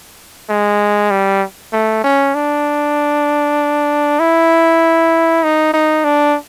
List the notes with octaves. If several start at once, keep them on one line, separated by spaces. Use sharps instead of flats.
G#3
G3
A3
C#4
D4
E4
D#4
D#4
D4